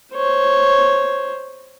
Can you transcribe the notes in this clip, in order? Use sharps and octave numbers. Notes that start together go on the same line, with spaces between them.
C5 C#5